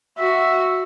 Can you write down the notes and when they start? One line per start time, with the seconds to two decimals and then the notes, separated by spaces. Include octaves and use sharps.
0.18 F#4 E5